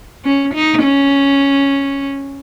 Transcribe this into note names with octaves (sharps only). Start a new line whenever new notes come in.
C#4
D#4
C#4